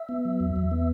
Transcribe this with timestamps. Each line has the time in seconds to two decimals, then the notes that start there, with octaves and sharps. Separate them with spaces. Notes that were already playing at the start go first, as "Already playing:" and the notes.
Already playing: E5
0.09 B3
0.25 F#3
0.40 E2
0.56 E2
0.71 B3